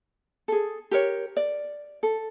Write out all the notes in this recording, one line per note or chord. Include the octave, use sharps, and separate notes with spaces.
G#4 A4
G4 A#4 C#5
D5
A4